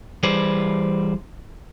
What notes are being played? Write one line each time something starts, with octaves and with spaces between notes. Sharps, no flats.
E3 G3 G#4 B4 C5 D5